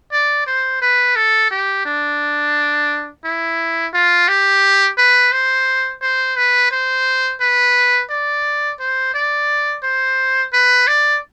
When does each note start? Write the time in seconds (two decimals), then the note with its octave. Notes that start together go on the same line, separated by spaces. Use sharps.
0.12 D5
0.47 C5
0.81 B4
1.16 A4
1.51 G4
1.85 D4
3.24 E4
3.94 F4
4.28 G4
4.98 B4
5.32 C5
6.02 C5
6.36 B4
6.71 C5
7.40 B4
8.10 D5
8.79 C5
9.14 D5
9.83 C5
10.53 B4
10.87 D5